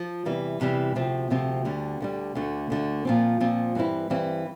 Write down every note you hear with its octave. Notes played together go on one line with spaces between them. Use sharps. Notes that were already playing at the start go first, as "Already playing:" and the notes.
Already playing: F3
E2 C3 E3 G3
E2 C3 E3 G3
D2 C3 F3 C4
D2 C3 F3 C4
D2 D3 G3
D2 D3 G3
D2 D3 A3
D2 D3 A3
A#2 F3 C4
A#2 F3 C4
G2 E3 G3 C4 E4
G2 E3 G3 C4 E4